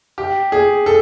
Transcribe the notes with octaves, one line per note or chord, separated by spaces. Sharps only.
G4
G#4
A4